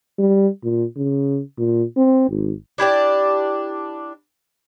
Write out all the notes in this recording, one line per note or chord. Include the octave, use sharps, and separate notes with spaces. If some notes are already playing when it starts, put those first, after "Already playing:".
G3
A#2
C#3
A#2
C4
G#1
D4 E4 G4 D5